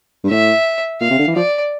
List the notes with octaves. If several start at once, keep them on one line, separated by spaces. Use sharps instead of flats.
G2
A2 E5
A#2 F5
C3
D3
E3
F3 D5